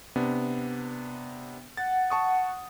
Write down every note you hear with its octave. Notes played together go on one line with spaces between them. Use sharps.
C3 B3 D4
F#5 A6
A5 C#6 D#6